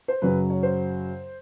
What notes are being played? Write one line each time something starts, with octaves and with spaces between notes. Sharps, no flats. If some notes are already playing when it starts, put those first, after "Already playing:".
C5
F#2 C#3 F#3 B4
C#5
C5